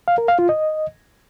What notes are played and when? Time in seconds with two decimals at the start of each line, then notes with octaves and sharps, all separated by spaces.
0.08 F5
0.18 A#4
0.28 F5
0.39 F4
0.49 D#5